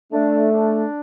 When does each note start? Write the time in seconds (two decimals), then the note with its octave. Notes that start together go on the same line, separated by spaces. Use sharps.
0.13 A3 D4
0.52 D4